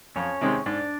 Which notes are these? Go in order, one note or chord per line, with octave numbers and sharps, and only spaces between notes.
F2 C#4 C#5
C3 D#3 G#3 C4
G#2 D4 D5